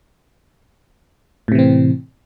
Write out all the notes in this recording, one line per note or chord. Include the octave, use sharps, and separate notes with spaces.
A2 C3 E3 C4